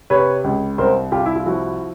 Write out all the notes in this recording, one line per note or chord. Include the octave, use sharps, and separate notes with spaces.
C3 B4 C#5
C#2
C2 A#4 C5
C2 F4 G4
E4
F4
F3 E4 F#4